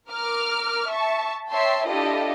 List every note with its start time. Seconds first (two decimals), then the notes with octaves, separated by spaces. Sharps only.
0.10 A#4 D6 F6
0.88 E5 A5 C#6
1.52 C#5 E5 G5 A5 C6
1.88 D4 E4 F4 G4 A4 D#5